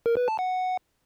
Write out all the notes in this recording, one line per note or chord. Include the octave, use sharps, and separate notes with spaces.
A#4
B4
A5
F#5